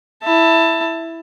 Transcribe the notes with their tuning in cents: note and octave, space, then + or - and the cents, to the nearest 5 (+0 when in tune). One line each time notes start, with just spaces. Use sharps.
E4 +0 A5 +20